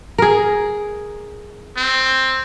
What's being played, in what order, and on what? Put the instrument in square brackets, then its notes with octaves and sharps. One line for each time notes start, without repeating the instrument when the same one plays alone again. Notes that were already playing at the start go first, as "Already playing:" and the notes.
[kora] G#4 A#4
[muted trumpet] C4